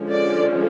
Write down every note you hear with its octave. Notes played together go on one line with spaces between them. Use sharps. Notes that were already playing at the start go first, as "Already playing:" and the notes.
Already playing: D3 F3 G#3 C#4
D5